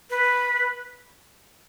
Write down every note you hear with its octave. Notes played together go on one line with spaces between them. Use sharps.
B4